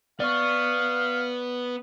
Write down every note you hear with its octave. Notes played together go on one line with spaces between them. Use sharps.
B3 D5 F5 C#6